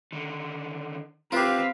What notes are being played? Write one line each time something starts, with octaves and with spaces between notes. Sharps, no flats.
D3 D#3
C4 F4 G4 B4 F5